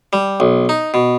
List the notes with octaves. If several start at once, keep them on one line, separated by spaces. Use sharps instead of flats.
G3
B1
D#4
B2